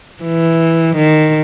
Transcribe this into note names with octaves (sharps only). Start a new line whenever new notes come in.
E3
D#3